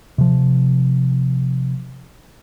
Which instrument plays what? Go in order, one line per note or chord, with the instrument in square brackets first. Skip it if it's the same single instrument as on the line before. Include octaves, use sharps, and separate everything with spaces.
[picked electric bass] C3 F3